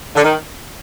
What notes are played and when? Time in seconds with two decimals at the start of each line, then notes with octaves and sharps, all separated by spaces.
0.15 D3
0.24 D#3